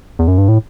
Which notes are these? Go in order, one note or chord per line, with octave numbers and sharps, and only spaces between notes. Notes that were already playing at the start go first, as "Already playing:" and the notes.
E2
F#2
G2
A2